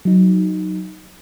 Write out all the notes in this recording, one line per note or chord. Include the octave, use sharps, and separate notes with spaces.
F#3 D#4